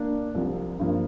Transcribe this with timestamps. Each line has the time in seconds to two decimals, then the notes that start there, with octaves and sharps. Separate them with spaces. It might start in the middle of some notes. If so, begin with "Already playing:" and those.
Already playing: A#3 D4
0.35 C2 C3 F3
0.79 G2 F3 A#3